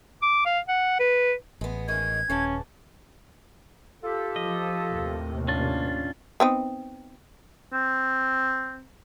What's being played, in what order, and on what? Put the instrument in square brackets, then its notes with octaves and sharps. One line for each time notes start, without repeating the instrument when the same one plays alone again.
[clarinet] D6
F5
F#5
B4
[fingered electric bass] A1 [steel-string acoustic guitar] G#3 B3
[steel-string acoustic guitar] D#3 G#3 C#4 [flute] G#6
[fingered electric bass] D#1 [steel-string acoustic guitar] C#3 E3 A5 [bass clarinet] C#4
[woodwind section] F4 G4 A4
[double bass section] F3 [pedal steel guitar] D#5
[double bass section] D#2 A2 C3
[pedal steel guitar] C#4 D4 F4
[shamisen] B3 C4 D#4
[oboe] C4